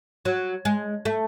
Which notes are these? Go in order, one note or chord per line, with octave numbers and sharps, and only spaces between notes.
F#3
G#3
A3